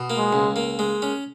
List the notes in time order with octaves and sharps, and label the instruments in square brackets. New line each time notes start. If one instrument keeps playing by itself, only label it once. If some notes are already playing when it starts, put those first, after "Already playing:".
Already playing: [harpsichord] B2
A#3
[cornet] G#3
[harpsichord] C#2
A#3
G#3
C#4